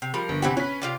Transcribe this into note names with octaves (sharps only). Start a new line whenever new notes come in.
C3
F3 G3 A#4
G1
C3 E3 C4 G4 E5 F#5
C#4 B4 B6
C3 F4 D5